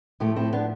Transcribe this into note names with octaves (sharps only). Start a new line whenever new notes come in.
A2 F3 A3 E4 G4
C4 E4
B3 D4